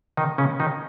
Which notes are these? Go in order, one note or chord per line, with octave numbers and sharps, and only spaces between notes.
D#3 D#4
C#3 C#4
D#3 D#4